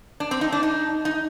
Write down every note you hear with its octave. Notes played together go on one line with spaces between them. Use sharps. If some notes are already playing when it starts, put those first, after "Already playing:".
D4
C4
D#4
D4
D#4
D#4